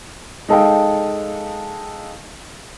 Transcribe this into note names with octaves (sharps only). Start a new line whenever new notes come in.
G#3 D#4 A4 D#5 F5 G5